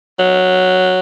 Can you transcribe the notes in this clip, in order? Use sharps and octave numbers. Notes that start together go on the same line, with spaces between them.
F#3